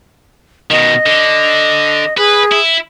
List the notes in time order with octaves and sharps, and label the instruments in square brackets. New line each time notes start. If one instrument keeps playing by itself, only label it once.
[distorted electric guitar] B2 D#3 [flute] D#5
[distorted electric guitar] D3
[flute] G#4 [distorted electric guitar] B4
[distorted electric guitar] E4